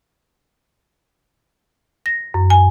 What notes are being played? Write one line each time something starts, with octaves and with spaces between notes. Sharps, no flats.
A#6
F#2
G#5